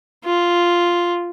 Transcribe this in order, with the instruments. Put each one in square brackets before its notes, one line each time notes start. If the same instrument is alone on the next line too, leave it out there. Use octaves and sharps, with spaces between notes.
[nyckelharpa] F4